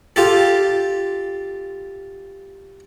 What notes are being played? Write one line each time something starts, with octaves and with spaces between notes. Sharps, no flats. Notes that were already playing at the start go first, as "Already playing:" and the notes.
F4 G4 A4